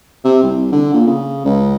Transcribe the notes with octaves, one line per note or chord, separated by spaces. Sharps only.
C3
C2
D3
A#2
C#3
C#2